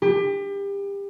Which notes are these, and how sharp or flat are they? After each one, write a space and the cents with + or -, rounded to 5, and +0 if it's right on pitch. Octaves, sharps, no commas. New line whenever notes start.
G4 +30